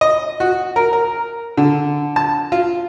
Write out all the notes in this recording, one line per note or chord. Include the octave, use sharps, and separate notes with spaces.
D#5
F#4
A#4
A#4
D3
A5
F4